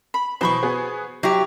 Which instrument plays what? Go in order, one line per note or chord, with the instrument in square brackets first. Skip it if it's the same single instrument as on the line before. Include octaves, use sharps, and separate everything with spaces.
[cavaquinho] B5
[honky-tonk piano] B2 E3 F#3 [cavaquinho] C5 B5 C#6
[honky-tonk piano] B3 F#4 G#4
[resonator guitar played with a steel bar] F#3 G4 [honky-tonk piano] E4